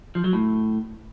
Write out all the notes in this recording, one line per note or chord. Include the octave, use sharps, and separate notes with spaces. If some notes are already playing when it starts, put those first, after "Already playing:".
F3
F#3
A2